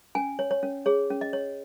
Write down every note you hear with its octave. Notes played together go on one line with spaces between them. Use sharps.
C#4 G#5
C#5
C#5
C#4
G#4 C#5
C#4
D#5
C#5